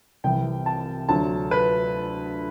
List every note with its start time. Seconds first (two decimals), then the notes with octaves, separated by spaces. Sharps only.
0.24 C2 C3 E3 G5
0.66 A5
1.09 D2 D3 F#3 A5
1.51 B4